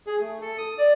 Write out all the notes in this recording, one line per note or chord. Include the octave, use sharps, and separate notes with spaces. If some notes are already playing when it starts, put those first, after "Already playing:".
G#4
A3
A4
D#6
D5